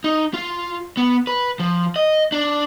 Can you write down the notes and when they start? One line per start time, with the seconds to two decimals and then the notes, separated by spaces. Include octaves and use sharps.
0.04 D#4
0.34 F4
0.97 B3
1.27 B4
1.60 F3
1.96 D#5
2.32 D4